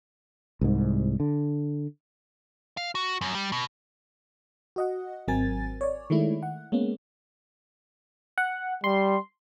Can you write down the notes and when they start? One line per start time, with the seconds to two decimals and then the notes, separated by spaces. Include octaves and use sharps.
0.61 C2 G#2
1.20 D3
2.77 F5
2.95 F#4
3.21 F#2
3.35 G3
3.52 B2
4.76 F#4 D#5 F#5
5.28 G#1 F#3 C4 A#4 G#5 A6
5.81 C#5 D5
6.10 D#3 G#3 A3 E4
6.43 F#5
6.72 G#3 A#3 B3 C#4
8.38 F#5
8.84 G3 C6